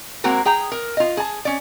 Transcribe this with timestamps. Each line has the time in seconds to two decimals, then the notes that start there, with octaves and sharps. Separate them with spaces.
0.24 G#3 A#3 C4 F#4 A#4
0.45 G#4 G5 A#5
0.72 A#4
0.97 F4 D#5
1.17 G#4 A5
1.45 C#4 D5